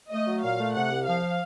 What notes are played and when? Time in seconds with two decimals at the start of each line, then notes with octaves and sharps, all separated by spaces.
0.11 A3 D#5
0.27 F#3
0.43 A#2 F5
0.58 A3
0.74 C3 F#5
0.91 C2
1.06 F3 F5